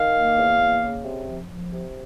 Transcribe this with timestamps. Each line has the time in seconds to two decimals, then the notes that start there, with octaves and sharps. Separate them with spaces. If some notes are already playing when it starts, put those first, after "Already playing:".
Already playing: D#3 F5
0.15 A#3
0.37 E2
0.60 A#3
0.83 C#3
1.04 C3
1.27 F3
1.48 F3
1.71 C3